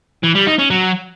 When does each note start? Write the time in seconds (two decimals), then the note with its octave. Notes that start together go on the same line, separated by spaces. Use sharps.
0.23 E3
0.35 G3
0.47 D#4
0.58 C#4
0.70 F#3